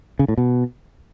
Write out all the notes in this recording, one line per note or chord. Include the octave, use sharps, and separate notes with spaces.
C#3
A2
B2